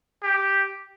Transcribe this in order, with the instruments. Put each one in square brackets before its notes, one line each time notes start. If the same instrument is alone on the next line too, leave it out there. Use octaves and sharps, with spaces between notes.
[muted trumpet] G4